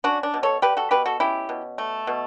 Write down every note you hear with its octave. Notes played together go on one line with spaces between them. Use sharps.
C#4 D4 F#4
D4
B2
A4 C#5
G3 G4 B4
F#4 A4
B2 G4 B4
F#4 A4
C#4 E4 G4
B2
A3
B2